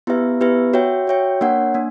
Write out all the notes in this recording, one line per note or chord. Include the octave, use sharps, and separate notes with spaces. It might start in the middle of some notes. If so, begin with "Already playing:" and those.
B3 E4 G4 B4 E5
B3 E4 G4 B4 E5
F#4 C#5 E5 G5
F#4 C#5 E5 G5
A#3 D4 A#4 C#5 F#5
A#3 D4